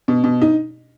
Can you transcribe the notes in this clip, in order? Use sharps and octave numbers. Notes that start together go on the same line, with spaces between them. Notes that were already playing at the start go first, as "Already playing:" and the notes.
B2
B2
D#4